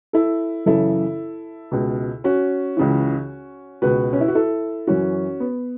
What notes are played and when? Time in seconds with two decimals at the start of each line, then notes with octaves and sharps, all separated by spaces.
0.13 E4 A4
0.66 F#2 C#3 E3 E4 A4
1.72 C#2 B2
2.24 C#4 F#4
2.77 C#2 C#3 E3
3.82 C#2 B2 F#4 B4
4.13 C#4
4.21 E4
4.28 F#4
4.35 E4 A4
4.87 F#2 E3 C#4 F#4
5.40 B3